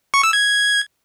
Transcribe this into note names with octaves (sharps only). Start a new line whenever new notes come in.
C#6
E6
G#6